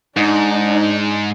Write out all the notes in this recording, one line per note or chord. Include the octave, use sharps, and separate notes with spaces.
G#2 D4 D#4